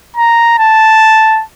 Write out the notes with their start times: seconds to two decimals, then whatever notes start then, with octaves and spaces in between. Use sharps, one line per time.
0.16 A#5
0.59 A5